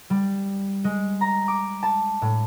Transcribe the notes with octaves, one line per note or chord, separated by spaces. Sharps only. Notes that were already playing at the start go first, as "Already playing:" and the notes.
G3
G#3
A#5
D6
A5
A2